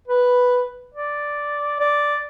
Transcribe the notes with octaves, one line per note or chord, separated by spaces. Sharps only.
B4
D5
D5